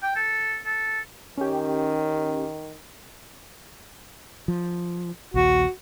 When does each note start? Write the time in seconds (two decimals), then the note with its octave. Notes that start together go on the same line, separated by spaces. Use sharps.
0.03 G5
0.16 A4
0.66 A4
1.38 D#3 C#4 G4
4.48 F3
5.34 A#1 D#2 F#4